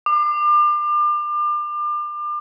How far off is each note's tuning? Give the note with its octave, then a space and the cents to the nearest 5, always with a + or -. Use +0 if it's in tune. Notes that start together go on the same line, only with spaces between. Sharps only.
D6 +35